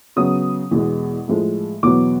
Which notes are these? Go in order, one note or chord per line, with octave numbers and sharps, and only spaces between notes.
C#3 F#3 B3 D#6
E2 B2 G#3
A2 F3 G#3
E2 B2 F#3 B3 D6